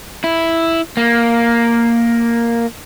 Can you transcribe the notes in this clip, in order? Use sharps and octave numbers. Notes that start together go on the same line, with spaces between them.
E4
A#3